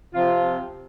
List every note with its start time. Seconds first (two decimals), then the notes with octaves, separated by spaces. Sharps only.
0.14 C3 F3 F4